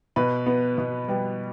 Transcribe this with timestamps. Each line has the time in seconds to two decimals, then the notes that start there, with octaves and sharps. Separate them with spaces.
0.16 B2 B4
0.46 B3
0.78 B2
1.08 G3 B4